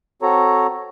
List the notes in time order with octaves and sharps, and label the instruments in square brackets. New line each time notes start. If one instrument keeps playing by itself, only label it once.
[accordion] C4 F#4 A4 C#5 A#5